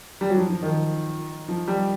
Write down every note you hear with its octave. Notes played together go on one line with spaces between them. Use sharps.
G3
F#3
F3
F3
D#3
F3
G3